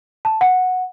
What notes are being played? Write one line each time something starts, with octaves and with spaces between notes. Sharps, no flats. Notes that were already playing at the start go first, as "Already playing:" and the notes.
A5
F#5